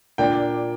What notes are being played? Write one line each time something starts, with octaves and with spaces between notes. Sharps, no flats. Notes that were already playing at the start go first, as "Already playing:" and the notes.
A#2 A#3 D4 G5